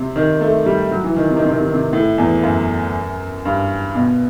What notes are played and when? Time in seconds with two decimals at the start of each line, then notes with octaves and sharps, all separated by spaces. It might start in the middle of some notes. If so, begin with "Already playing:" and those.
Already playing: C3
0.16 D#3
0.41 A3
0.66 G3
0.91 F#3
1.04 E3
1.17 D#3
1.30 C3
1.37 D#3
1.45 C3
1.51 D#3
1.59 C3
1.66 D#3
1.74 C3
1.93 A2
2.18 E2
2.43 F#2
3.45 G2
3.95 B2